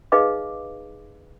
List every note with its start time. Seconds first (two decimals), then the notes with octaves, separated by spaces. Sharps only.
0.12 D#4 G#4 B4 D#5 F5 D6